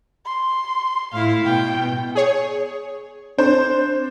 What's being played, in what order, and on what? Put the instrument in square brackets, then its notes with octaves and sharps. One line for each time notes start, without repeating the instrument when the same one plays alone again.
[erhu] C6
[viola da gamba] A2 E4 [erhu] F5
[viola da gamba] B2 [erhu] G5
[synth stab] G#4 C#5
[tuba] C4 [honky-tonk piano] D4 C5